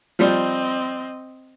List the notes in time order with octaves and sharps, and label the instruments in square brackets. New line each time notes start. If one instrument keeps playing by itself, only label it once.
[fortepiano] F3 G3 [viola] C4 D#5